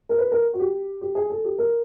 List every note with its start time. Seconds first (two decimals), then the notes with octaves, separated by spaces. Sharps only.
0.09 A#4
0.18 B4
0.31 A#4
0.53 F#4
0.59 G4
1.01 G4
1.15 G#4
1.29 A4
1.44 G4
1.58 A#4